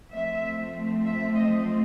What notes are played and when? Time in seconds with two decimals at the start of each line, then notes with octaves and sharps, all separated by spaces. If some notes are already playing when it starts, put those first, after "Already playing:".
0.11 F3 A3 C4 E5
1.05 E5
1.36 D#5